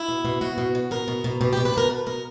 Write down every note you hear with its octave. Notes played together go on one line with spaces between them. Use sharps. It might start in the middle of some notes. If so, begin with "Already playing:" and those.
Already playing: E4
B2
B2
B2 F#4
B2
B2
B2 A#4
B2
B2
B2 G4
B2 G4
B4
B2 A#4
B2 B4
B2 A#4